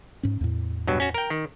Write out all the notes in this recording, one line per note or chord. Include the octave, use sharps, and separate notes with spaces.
G#2 C#4
E2 A2
G2 B2 F#3
C#4 F#4
A#4 G5
D#3